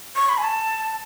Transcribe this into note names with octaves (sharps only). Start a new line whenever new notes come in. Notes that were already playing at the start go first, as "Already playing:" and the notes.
C#6
B5
G#5
A5